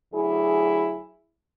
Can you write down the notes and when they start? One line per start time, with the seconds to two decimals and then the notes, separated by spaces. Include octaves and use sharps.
0.13 D2 F#3 E4 G#4